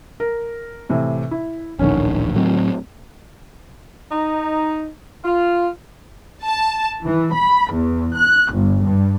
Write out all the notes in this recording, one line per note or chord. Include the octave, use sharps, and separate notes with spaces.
A#4
A2 C3 E3
E4
D1 A#1 D3 D#3 C#4
A2 F#3 C4
D#4
F4
A5
E3
B5
E2
F#6
G1
G2